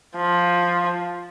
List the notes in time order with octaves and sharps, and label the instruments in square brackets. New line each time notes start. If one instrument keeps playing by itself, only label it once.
[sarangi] F3